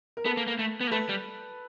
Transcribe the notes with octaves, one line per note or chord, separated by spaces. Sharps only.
A#4
B3 A4 B4
A#3
A#3
A3
B3
A#3
A3 A4 B4
G3